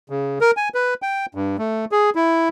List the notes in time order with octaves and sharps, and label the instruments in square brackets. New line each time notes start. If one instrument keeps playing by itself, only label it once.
[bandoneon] C#3
A#4
G#5
B4
G5
G2
A3
G#4
E4